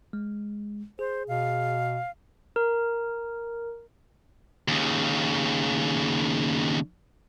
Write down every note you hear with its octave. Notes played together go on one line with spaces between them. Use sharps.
G#3
G#4 C5
B2 F5
A#4
D#2 C#3